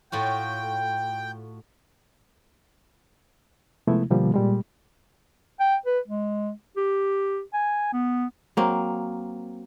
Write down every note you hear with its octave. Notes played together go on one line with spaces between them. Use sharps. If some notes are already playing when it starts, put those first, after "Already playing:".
A2 F4 F#4 G5
C3 F3 G#3 A3 B3 E4
B2 D3 F3 G3 A#3
A#2 G3 G#3
G5
B4
G#3
G4
G#5
B3
F#3 A#3 C4